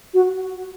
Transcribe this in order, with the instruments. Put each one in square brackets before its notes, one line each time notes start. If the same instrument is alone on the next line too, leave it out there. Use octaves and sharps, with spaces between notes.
[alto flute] F#4